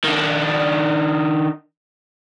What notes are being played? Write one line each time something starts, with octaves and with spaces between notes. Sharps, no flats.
D#3 D4